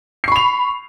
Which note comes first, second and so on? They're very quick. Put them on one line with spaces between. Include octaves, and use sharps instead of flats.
C7 C#6 B5 F7